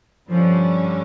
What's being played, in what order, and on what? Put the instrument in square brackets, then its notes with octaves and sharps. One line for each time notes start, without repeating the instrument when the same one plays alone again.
[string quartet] G2 D3 G3 C#4 [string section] F3